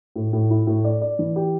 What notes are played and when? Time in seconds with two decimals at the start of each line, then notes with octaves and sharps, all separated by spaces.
0.16 A2
0.33 A2
0.50 E4
0.67 A2
0.84 D5
1.01 D5
1.19 E3
1.36 G4